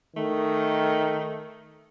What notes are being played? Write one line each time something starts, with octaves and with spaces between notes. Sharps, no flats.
D#3 A3